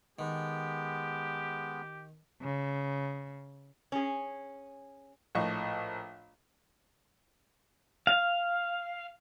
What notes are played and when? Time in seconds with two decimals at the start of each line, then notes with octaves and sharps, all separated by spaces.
0.19 D#3 G#3 B3 G4
2.42 C#3
3.92 C#4 G#4
5.35 A#1 A2 D#5 C#6
8.07 F5